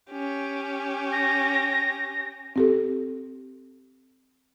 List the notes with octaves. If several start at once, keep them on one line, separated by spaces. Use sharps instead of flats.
C#4 G4
A#6
C4 G4 A4